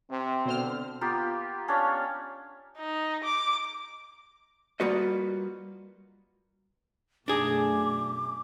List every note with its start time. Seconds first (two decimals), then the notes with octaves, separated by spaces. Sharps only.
0.10 C3 C4
0.45 B2 D3 C5 F6
1.01 A#3 B3 F4 G4
1.68 C#4 D4 C#5 F5
2.78 D#4
3.24 D6
4.80 G3 A#3 F4 F#4 B4 D#5
7.28 F#2 B2 A3 D4 G#4 D6